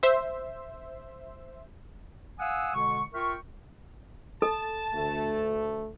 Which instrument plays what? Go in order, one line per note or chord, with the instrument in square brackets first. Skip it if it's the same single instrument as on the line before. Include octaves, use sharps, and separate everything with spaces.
[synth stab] C5 E5
[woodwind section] F5 F#5 G#5 D#6 E6
B2 D3 G#3 C#6
F4 A#4 E5 G5 C#6
[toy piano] A4 [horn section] A5
[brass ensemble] D2 A3